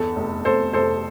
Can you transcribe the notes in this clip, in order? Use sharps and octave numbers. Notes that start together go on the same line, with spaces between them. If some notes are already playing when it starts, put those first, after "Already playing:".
Already playing: G1 E2 A4
F1
F1 A4 C5
F1 A4 C5